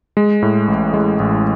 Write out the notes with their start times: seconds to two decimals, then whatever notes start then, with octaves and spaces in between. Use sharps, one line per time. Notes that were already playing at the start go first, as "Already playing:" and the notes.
0.17 G#3
0.42 A2
0.68 A1
0.94 G#3
1.20 A1